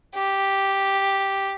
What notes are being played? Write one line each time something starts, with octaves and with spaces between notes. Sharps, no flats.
G4